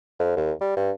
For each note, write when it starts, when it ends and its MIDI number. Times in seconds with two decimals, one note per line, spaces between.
0.19 0.35 41
0.37 0.52 39
0.61 0.74 55
0.77 0.91 43